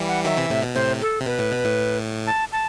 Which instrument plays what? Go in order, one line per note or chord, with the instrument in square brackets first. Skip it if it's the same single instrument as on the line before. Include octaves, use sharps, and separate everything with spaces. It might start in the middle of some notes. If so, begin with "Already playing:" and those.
Already playing: [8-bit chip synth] E3 G3
[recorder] F#5
[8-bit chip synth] D#3 F#3 [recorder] E5
[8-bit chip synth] C3 E3
A2 C3
B2
[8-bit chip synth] A2 C3 [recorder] C5
[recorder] A4
[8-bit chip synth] C3
[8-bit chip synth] B2 [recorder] B4
[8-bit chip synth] A2
B2
A2
[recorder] A5
A5